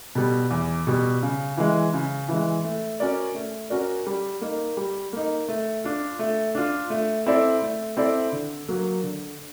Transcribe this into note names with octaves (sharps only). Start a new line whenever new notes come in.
B2 G3
E2
B2 G3
C#3
E3 G#3
C#3
E3 G#3
A3
C#4 F#4 A#4 D5
A3
C#4 F#4 A#4 D5
G3
A#3 D#4
G3
A#3 D#4
A3
D4 F4
A3
D4 F4
A3
C4 E4 A4 D5
A3
C4 E4 A4 D5
D3
F#3 A#3
D3